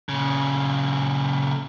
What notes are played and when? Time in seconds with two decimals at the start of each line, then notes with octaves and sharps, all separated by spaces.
0.09 A#2 C#3